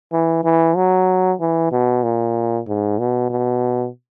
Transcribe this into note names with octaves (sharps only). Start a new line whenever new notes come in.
E3
E3
F#3
E3
B2
A#2
G#2
B2
B2